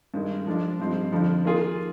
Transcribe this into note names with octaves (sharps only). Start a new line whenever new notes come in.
G2 D#3 G#3
F3 G#3 D4
G2 F3 C4 D#4
F2 D3 F3
D#3 A#3 F4 G#4